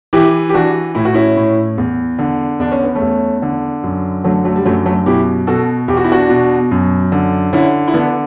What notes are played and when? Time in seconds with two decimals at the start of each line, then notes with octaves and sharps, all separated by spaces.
0.13 E3 E4 G4
0.49 G4
0.54 E3 D4 F#4
0.95 A2 E4
1.05 F#4
1.14 C#4 E4
1.37 A2
1.78 E2
2.19 D3
2.59 E2 D4
2.72 C#4
2.84 B3
2.95 A3 C#4
3.01 E2
3.42 D3
3.83 F#2
4.24 D3 F#3 A3
4.45 F#3 A3
4.56 G3
4.65 F#2 F#3 A3
4.86 F#3 A3
5.06 B2 E4 G4
5.47 B2 F#4 A4
5.88 E2 G4
5.97 F#4
6.04 E4
6.12 D4 F#4
6.29 B2
6.71 F#2
7.12 D3
7.53 D3 C#4 E4
7.88 E4
7.94 D3 B3 D4